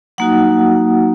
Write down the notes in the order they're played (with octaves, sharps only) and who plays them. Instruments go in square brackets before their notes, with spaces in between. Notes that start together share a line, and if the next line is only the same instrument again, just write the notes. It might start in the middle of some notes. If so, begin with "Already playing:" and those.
[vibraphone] F#3 A#3 D#4 F#4 F#5